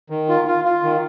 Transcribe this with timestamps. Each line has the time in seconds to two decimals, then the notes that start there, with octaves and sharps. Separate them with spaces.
0.10 D#3
0.29 F4
0.47 F4
0.65 F4
0.83 D#3